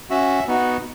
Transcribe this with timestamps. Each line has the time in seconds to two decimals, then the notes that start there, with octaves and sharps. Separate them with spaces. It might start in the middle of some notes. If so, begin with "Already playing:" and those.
0.10 C#4 F#4 E5
0.48 B3 D#4 F#4